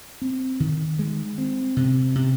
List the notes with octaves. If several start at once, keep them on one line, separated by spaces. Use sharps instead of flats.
C4
D#3
G#3
C4
C3
C3